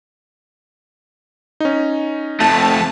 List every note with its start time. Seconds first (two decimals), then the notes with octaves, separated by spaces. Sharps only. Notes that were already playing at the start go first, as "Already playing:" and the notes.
1.60 C#4 D#4
2.40 F2 A3 A5